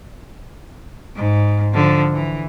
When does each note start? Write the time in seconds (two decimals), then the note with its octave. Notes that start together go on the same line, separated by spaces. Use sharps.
1.15 G#2
1.73 D3 F3
2.12 E3